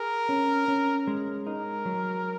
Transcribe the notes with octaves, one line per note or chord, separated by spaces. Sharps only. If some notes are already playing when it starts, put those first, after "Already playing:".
Already playing: G#4 A#4
C#4
C#4
G#3
D#4 A#4
F#3